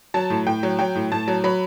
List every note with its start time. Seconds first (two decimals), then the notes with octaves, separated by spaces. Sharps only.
0.14 F#3 A5
0.30 A2
0.46 A2 G5
0.63 F#3
0.79 F#3 G5
0.95 A2
1.12 A2 A5
1.28 F#3
1.44 F#3 B5